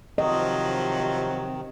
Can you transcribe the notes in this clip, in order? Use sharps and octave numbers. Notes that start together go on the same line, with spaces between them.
C3 D#3 F3 F#3 D#5